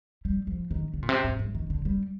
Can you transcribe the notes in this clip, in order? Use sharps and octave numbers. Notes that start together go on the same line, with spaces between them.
G3
F3
D#3
D3
A#2
C3
G#2
G2
D#3
D3
G3